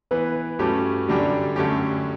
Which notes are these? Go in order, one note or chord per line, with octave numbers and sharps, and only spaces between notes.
E3 B3 E4 B4
G2 F#3 A3 C#4 G4
F#2 D3 G3 D4 G4
F#2 D3 A3 C#4 G4